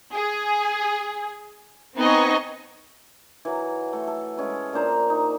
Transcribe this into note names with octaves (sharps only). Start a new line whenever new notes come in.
G#4
B3 C4 D#4 D#5 G#5 C#6
E3 F#3
A3
A4
G#3 C#4 B4
A#2 D4 C5 A#5
D#4